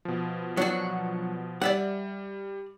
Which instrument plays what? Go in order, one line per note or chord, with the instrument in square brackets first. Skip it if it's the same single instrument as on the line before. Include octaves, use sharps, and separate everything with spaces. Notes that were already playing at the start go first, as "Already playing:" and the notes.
[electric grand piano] B2 F3
[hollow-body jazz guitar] F#3 D4 F#4
[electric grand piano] G3 [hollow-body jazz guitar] D5 E5 F#5